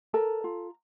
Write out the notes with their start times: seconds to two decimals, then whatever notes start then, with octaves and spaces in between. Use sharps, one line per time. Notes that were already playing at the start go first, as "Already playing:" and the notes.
0.14 A4 A#4 A#5
0.44 F4